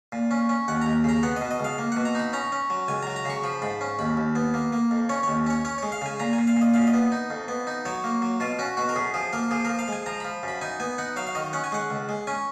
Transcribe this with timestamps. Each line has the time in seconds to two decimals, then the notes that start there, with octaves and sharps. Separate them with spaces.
0.12 A#2
0.31 C#4
0.49 C#4
0.68 D#2 F#5
0.82 D#2 A#5
1.04 C#3 A#5
1.23 B3 F#5
1.36 B2 D#5
1.51 D#5
1.60 C#2 F5
1.78 A#3
1.92 B2 F#5
2.05 A#5
2.15 D#4 B5
2.33 C#4 A#5
2.52 C#4
2.70 F#3
2.88 C#2 G#5
3.03 F#3 A#5
3.16 A#5
3.25 C#3 C#6
3.44 F3 B5
3.62 G#2 B5
3.81 C#4
3.99 D#2 B5
4.17 D#2
4.35 B3
4.54 A#3
4.73 A#3
4.91 F2
5.09 C#4 C#5
5.23 D#2 C#5
5.47 C#4 C#5
5.65 C#4 C#5
5.78 G#3 C#5
5.92 F5
6.01 C#3 G#5
6.20 A#2 A#5
6.33 G#5
6.38 A#2
6.47 F5
6.56 A#2 D#5
6.74 F#2 F5
6.87 D#5
6.93 B3
7.12 D#4
7.30 F2
7.48 B3
7.67 D#4
7.85 F#3 C#5
8.04 A#3
8.22 F#3
8.40 B2 F4
8.59 C#4 F#4
8.77 B2 F#4
8.89 A#4
8.96 F#2 G#4
9.14 F3 G#4
9.33 A#3 A#4
9.51 F3 G#4
9.65 F3 A#4
9.79 F5
9.88 G#3 G#5
10.06 F3 A#5
10.20 F3 B5
10.43 F#2 B5
10.61 D#4 G#5
10.80 B3 G#5
10.98 D#4 F#5
11.16 F#3 F5
11.27 F5
11.35 D#3 D#5
11.53 C#4 F#5
11.64 G#5
11.72 G#3 F#5
11.90 C#2
12.09 G#3
12.27 C#4 G#5